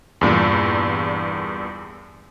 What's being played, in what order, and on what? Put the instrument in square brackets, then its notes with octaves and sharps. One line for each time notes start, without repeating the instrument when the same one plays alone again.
[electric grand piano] E2 G2 A#2